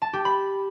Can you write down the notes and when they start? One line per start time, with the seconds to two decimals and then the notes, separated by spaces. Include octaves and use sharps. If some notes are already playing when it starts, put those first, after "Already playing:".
0.02 A5
0.13 G4
0.25 B5